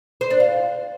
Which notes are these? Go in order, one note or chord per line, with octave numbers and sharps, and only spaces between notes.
C5
D4
F4